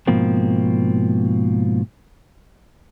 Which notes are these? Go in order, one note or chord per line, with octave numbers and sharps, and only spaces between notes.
G#2 B2 F3 A#3 C4